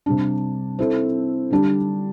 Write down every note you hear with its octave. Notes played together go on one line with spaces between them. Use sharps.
C3 G3 D4
C4 E4 A4
D3 G3 D4 G4